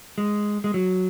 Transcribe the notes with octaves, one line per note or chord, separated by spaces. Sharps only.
G#3
G#3
F#3